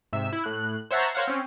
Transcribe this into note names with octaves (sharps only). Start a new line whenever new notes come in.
G#2 C3 E5 E7
E4
A2 F#6
C5 C#5 E5 F#5 A5 A#5
A#4 C5 C#5 F5 F#5
C4 C#4